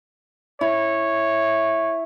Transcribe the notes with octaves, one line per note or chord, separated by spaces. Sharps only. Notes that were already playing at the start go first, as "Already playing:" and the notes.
E4 C#5